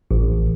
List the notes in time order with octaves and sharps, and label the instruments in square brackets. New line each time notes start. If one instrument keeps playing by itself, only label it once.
[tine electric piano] A1